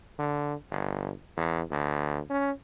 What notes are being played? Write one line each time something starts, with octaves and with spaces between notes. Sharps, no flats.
D3
G1
E2
D2
C#4